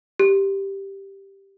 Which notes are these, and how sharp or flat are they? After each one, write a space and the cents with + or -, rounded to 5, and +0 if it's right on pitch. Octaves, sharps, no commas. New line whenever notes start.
G4 +0